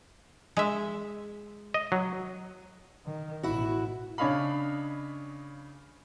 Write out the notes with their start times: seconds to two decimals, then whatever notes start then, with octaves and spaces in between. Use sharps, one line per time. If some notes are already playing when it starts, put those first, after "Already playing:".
0.57 G#3 E5
1.74 D#5
1.92 F#3
3.05 D#3
3.43 A1 B2 E4 F#4
4.18 C#3 D4 C#5 D#5 F5 B5